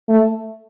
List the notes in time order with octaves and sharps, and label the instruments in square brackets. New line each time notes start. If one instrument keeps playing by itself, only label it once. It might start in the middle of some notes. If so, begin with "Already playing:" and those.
[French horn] A3